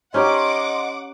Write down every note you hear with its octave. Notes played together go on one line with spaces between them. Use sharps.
C#4 D#4 G4 D#5 F#5 C6 D6